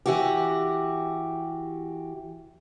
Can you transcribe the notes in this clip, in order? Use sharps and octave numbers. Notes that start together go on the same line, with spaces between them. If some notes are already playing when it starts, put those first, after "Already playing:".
E3 F#4 G4